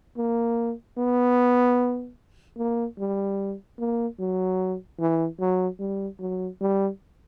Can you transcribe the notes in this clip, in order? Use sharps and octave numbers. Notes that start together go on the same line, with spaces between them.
A#3
B3
A#3
G3
A#3
F#3
E3
F#3
G3
F#3
G3